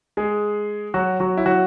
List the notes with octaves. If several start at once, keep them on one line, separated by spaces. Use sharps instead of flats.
G#3 G#4
F#3 F#4
F#3 F#4
E4
F#3 F#4